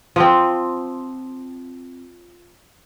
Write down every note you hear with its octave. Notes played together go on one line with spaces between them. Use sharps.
F3 C4